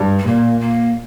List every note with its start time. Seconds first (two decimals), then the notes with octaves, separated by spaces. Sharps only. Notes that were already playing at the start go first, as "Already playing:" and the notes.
Already playing: G2
0.19 G3
0.27 A#2 A#3
0.61 A#3